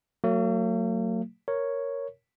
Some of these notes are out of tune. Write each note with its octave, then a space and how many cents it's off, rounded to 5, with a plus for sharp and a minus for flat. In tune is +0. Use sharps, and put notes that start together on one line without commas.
F#3 +0 A#3 -45
A#4 +0 C#5 +0